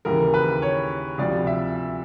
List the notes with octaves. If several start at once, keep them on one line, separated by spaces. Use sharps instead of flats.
D#2 C#3 E3 A#4
B4
C#5
D2 C3 F3 D5
E5